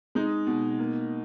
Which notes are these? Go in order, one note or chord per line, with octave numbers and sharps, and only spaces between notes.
G#3 D#4
B2
A#3